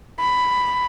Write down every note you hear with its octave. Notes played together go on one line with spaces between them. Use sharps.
B5